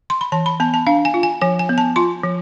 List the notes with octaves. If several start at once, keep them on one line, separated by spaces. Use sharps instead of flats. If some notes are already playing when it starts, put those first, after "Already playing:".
C6
B5
E3 A5
B5
B3 A5
A5
D4 F5
G#5
F4
G#5
F3 G#5
G#5
B3
A5
F4 C6
F3